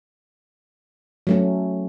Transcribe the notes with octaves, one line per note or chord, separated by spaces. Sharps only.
F#3 A3 C#4